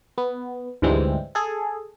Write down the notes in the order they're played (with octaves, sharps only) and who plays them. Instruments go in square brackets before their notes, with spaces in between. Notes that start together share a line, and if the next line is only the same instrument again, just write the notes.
[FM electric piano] B3
D2 G#2 E3 G3 G#3 C4
G#4 A4